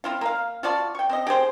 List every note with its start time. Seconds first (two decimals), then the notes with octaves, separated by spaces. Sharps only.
0.04 C4 E4 F4
0.21 A#3 F5
0.63 F4 F#4 D5 A5
0.95 G5 C#6
1.09 C4 D#5
1.27 G4 G#4 C5